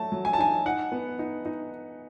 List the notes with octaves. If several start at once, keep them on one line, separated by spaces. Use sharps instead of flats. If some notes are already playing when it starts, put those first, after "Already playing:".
Already playing: F#3 A3 A5
F#3
G#5
A5
D#4 G#5
D#4 F#5
B3
D#4
D#4